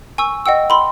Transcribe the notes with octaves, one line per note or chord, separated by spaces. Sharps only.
G#5 C#6 E6
D#5 F#5 G5 E6
B5 C6